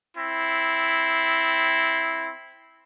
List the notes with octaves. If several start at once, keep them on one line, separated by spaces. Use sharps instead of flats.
C4 E4